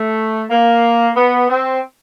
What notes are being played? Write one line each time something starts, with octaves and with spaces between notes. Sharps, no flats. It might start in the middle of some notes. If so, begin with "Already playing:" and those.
Already playing: A3
A#3
B3
C4